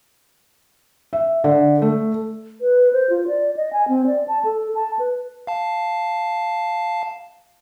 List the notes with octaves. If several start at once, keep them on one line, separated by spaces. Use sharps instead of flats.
E5
D3
A3
B4
C5
F4
D5
D#5
G#5
C4
D5
A5
A4
A5
B4
F5 A5